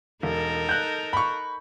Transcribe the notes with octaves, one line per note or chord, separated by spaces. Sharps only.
E1 D#4 A4 A#4
F#6 G6
B5 C#6